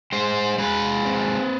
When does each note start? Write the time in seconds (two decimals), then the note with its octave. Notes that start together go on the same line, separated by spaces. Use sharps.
0.12 G#3 C5
0.58 G#3 B4
1.05 C4